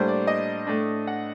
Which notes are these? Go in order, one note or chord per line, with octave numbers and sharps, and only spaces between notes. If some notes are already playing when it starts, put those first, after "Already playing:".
Already playing: A2 G3 A#3 D4 C5
D5
D#5
A2 A3 D4
F#5